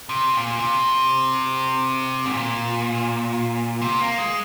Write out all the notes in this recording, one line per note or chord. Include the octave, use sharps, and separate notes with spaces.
C3
A#2
C3
G#2
A#2
C3
A#3
G#3